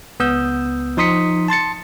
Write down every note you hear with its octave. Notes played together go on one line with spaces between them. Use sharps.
C#2 B3 D#6 E6 G6
F3 D#4 C6 D#6 B6 C#7
A5 C6 A6 C#7